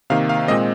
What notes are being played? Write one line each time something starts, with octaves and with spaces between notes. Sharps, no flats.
C3 D#3 A#3 F5
F5
A#2 G#3 C4 D#5